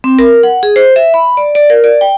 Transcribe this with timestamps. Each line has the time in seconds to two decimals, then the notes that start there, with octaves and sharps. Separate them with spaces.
0.04 C4
0.19 A#4
0.43 F#5
0.63 G#4
0.76 C5
0.96 E5
1.14 B5
1.37 D5
1.55 D5
1.70 A#4
1.84 D5
2.01 G5